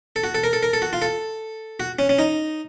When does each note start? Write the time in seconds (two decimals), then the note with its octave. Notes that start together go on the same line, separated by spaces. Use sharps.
0.16 A4
0.24 F#4
0.35 A4
0.44 A#4
0.53 A4
0.63 A#4
0.73 A4
0.82 F#4
0.93 F4
1.02 A4
1.80 F#4
1.99 C#4
2.09 C#4
2.19 D#4